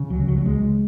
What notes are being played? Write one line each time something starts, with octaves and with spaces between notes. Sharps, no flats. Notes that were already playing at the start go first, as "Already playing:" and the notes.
Already playing: C#3
C#2 F#3
C#2 F#3
F#3
C#2 G#3